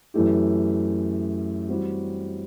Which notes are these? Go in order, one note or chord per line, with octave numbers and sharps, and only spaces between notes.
F#2 E3 A3 E4 G4
E3 G3 C4 F#4